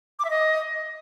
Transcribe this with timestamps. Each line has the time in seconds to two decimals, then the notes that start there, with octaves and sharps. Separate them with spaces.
0.19 D6
0.25 E5
0.30 D#5